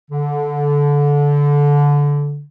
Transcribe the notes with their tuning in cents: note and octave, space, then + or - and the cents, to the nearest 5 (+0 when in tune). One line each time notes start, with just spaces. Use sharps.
D3 -20